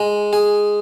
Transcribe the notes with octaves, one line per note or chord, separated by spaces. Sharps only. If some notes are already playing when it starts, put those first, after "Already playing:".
Already playing: G#3
G#4